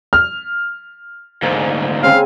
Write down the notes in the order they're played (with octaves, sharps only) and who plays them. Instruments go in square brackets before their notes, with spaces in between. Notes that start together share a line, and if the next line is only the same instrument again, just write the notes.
[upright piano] F6
[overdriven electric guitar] D2 G#2 [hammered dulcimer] A#3
[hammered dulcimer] C#3 C4 G#5 [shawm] F5